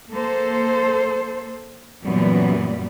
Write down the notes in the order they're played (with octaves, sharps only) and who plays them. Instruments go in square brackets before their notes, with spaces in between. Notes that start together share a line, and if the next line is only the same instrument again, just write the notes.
[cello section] A#3 A4 C5
F#2 A#2 E3 G3 B3